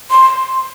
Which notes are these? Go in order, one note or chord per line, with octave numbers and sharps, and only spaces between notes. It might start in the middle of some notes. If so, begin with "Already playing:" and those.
C6